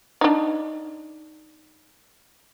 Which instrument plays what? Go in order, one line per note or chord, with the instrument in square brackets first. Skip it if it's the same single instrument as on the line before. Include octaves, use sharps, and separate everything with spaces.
[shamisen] D4 D#4